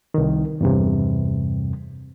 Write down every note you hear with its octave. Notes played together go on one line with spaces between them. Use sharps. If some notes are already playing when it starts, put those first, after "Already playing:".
C2 D#3
E2 G2 C3